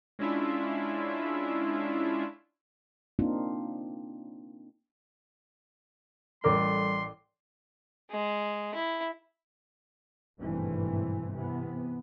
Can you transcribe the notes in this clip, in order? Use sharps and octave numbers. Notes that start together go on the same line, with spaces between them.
G#3 C#4 D4 E4 F4 E5
A#3 C4 D4 D#4 F4
A1 G3 A4 A#4 D5 C6 D6
G#3
E4
G#1 G2 B2 E3 A3 C4
C3 E3 B3